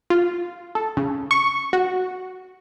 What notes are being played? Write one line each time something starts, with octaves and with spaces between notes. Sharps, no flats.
F4
A4
C#3
C#6
F#4